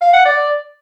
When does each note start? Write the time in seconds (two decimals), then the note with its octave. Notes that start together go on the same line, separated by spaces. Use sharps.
0.01 F5
0.13 F#5
0.25 D5